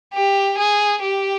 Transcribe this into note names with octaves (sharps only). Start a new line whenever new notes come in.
G4
G#4
G4